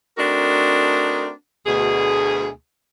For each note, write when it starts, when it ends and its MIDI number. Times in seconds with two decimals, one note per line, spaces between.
0.18 1.30 57
0.18 1.30 60
0.18 1.30 62
0.18 1.30 63
0.18 1.30 66
0.18 1.30 70
1.67 2.49 38
1.67 2.49 47
1.67 2.49 68